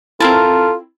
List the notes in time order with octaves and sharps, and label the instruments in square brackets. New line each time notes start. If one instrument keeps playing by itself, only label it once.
[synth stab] C4 E4 [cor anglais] F4 [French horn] A4 [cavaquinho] A#4 A5